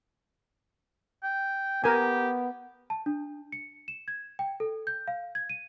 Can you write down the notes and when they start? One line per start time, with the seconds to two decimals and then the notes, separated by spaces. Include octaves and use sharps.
1.23 G5
1.84 B3 G4 A#4 G#5
2.90 A5
3.06 D4
3.52 C#7
3.88 E7
4.08 G#6
4.39 G5
4.60 A4
4.87 G6
5.08 F5
5.35 G#6
5.50 D#7